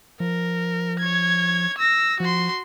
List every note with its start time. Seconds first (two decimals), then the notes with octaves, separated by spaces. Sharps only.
0.20 F3 A#4
0.99 C#5 G#6
1.78 E6 A#6
2.20 F3 F#4 C6